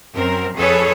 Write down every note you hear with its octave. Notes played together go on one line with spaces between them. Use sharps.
F#2 C4 A#4
F2 G#4 A4 B4 C#5